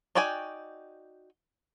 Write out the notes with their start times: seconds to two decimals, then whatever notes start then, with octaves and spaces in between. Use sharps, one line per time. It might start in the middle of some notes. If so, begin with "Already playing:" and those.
0.15 D#4 F#4 D5 G5 G#5